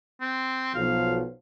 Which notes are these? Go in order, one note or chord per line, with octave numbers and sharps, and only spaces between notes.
C4
B1 F3 F5